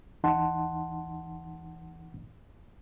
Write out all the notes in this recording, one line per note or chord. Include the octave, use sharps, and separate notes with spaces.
D#2 E3 D#4 F#5 A5 C6